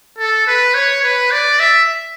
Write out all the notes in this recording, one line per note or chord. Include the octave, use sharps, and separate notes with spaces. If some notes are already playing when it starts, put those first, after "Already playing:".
A4
B4
C#5
B4
D5
E5